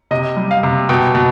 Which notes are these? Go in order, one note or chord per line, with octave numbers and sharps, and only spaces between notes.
C3 D#5
G3
F5
C3
B2 G5
B2